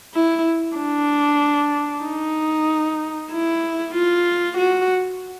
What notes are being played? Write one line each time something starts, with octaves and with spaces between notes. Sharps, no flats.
E4
D4
D#4
E4
F4
F#4